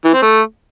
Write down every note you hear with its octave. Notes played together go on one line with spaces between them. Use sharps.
E3
C4
A3